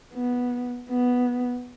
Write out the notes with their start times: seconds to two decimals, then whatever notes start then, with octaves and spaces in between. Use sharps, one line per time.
0.14 B3
0.90 B3